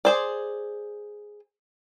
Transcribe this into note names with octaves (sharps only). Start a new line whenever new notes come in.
G#4 C5 D5